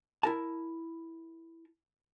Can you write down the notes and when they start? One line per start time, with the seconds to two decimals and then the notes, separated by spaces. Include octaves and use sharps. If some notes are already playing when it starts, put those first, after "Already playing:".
0.23 E4 A#4 A5